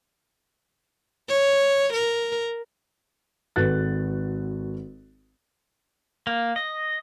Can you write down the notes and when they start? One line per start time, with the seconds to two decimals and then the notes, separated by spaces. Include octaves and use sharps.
1.29 C#5
1.93 A#4
3.56 G#1 F#4 A4 B4 F#6 A6
6.27 A#3
6.56 D#5